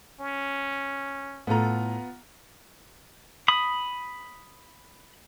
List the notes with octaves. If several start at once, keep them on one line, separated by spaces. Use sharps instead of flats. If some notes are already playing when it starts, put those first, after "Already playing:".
C#4
A2 B3 F4 A4 A#5
B5 D#6